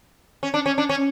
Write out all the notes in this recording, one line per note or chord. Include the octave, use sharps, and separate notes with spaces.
C#4
D4
C#4
D4
C#4